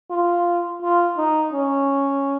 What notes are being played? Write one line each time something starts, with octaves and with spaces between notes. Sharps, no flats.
F4
F4
D#4
C#4